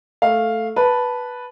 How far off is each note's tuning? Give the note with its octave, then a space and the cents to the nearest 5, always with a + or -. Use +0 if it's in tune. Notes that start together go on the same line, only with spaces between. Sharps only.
A3 +0 F5 +0
B4 -5 A5 +0